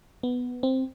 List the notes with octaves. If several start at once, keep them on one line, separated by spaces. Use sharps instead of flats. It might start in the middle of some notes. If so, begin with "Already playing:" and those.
B3
C4